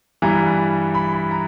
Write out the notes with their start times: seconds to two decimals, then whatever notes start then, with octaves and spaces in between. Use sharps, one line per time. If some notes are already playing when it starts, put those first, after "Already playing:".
0.22 G2 E3 G3 A#5
0.94 B5
1.12 B5
1.31 A#5